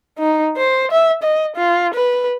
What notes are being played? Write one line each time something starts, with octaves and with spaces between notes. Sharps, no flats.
D#4
C5
E5
D#5
F4
B4